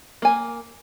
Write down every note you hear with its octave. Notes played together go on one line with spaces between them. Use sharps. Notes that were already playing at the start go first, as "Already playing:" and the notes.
A#3 G#5